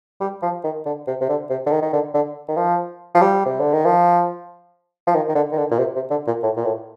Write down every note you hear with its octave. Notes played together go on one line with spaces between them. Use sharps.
G3
F3
D#3
D3
C3
C3
D3
C3
D3
D#3
D#3
D3
D3
D#3
F3
F3
G3
C3
D3
D#3
F3
F3
D#3
D#3
D3
D#3
D3
A#2
C3
C3
D3
A#2
A2
A#2
A2